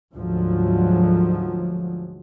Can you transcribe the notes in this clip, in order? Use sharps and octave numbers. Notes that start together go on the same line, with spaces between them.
D2 G#2 F3 F#3